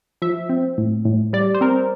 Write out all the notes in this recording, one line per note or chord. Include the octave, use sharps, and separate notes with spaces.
F3 E5
C4
A2
A2
G3 D5
C5
C4 A#4